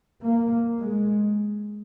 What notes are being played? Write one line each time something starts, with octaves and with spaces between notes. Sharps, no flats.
A#3
G#3